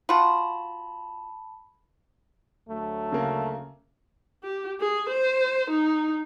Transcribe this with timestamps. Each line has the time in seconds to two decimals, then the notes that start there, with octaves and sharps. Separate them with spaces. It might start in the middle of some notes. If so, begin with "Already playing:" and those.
0.09 F4 F#4 A5 B5
2.69 D2 F#3 A3
3.12 C#3 A#3
4.43 G4
4.80 G#4
5.09 C5
5.71 D#4